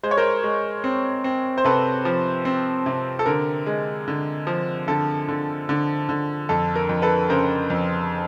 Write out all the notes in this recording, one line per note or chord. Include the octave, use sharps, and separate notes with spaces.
G#3 C5
C#5
A#4 C5
G#3
C4
C4
C5
C3 A4 B4
F3
C4
C3
A4
D3 A#4
G#3
D3
F3
D3 A4
D3
D3
D3
F2 A4
A#4
F2
A4 B4
C#3 A#4 C5
F2